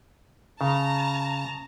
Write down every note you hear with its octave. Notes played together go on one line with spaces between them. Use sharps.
C#3 A5 A#5